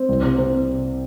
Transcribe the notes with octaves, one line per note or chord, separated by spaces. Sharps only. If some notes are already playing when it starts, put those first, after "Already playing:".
Already playing: C4
C2
C3
C3